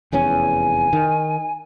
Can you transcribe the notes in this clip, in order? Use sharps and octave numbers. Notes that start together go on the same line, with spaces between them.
F1 E2 C#4 G#5
D#3